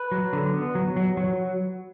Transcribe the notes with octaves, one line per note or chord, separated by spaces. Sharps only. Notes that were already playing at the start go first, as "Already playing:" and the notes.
Already playing: B4
F#3
D3
B3
F#3
F#3
F#3